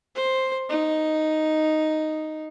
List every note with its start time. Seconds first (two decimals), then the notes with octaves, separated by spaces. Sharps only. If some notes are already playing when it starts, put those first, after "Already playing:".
0.15 C5
0.69 D#4